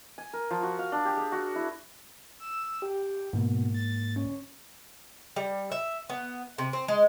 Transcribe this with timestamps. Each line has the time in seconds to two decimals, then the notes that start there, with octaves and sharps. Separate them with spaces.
0.18 G#5
0.33 A#4
0.51 F3
0.63 F#4
0.79 F5
0.92 D4
1.05 G4
1.17 G#4
1.32 F#4
1.56 E4
2.40 E6
2.82 G4
3.33 G#2 B2 D3 A#3
3.75 A6
4.16 C#4
5.36 G3
5.72 E5
6.09 B3
6.58 C3
6.73 C4
6.88 G#3